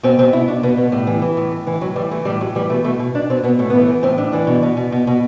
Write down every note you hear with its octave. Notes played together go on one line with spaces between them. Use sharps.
B2 C4
B2 C4
B2 E4
B2 D4
B2 B3
B2 B3
A2 G3
E3
E3
A2
A2
E3
A2 F#3
E3 G3
E3 A3
A2 G3
A2 F#3
E3 G3
B2 A3
B2 A3
B2
B2 D4
B2 C4
B2 B3
A2 A3
E3 B3
A3
E3
A2 C4
A2 D4
E3 D4
B2
B2
B2
B2
B2